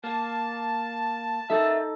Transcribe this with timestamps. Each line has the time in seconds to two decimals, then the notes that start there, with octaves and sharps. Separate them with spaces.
0.04 A#3 A5
1.50 D#4 A4 A#4 E5